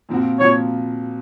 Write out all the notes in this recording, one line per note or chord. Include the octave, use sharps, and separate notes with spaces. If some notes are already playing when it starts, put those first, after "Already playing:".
A#2 F3 C4 F#4
A#2 F3 C4 F#4 C#5